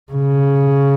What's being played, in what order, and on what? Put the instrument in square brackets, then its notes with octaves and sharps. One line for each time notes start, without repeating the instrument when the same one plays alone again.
[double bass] C#3